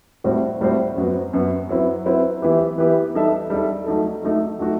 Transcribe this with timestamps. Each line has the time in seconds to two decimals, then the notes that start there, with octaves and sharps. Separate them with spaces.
0.24 A2 G3 C4 F#4 C5
0.61 A2 G3 C4 F#4 C5
0.97 F#2 F#3 B3
1.33 F#2 F#3 B3
1.69 F#3 C4 E4 B4
2.06 F#3 C4 E4 B4
2.42 E3 B3 E4 G4 B4
2.78 E3 B3 E4 G4 B4
3.15 G3 D#4 A4 E5
3.50 G3 D#4 A4 E5
3.86 F#3 A3 D#4 A4
4.23 F#3 A3 D#4 A4
4.59 F#3 A3 D#4 F#4